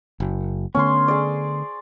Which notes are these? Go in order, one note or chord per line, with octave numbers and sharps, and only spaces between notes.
F#1
D3 A3 B3 C#4 C6
G#4 D5